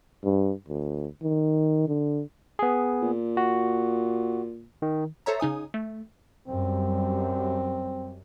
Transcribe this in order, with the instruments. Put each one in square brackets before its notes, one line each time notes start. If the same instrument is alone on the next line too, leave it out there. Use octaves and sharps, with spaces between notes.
[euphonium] G2
D2
D#3
D3
[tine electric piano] B3 G#4
[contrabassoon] A#2
[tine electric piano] F#4
D#3
[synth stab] A4 C5 C#5 E5 A#5
C#3 D#4 G#5 D#6
A3
[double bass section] F#2 G3 [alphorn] C4